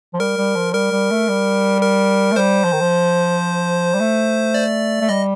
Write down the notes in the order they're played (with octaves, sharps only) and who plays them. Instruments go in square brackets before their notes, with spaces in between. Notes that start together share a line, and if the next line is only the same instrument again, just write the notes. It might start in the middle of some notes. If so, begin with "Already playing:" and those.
[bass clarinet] F3
[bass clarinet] G3 [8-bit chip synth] A#4
[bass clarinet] G3
F3
[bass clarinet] G3 [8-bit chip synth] A#4
[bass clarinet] G3
A3
G3
[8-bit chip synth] A#4
[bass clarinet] A3
[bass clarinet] G3 [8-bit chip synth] C5
[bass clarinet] F3
D#3
F3
G3
A3
[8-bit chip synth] D5
[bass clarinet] A3
[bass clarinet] G3 [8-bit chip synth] D#5